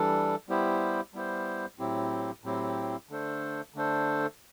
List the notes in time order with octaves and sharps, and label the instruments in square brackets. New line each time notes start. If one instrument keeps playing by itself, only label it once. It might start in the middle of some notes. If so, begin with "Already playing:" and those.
Already playing: [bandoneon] E3 G3 D4 A4
G3 B3 E4 G4 C5
G3 B3 E4 G4 C5
A2 F#3 C4 E4 G4
A2 F#3 C4 E4 G4
D3 A3 D4 A4 C5
D3 A3 D4 A4 C5